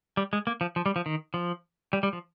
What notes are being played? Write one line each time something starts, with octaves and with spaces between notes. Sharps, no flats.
G3
G#3
A#3
F3
F3
G3
F3
D#3
F3
G3
G3
F3